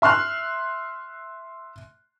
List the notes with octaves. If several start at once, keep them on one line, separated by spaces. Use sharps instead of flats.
E5 C6 F6 F#6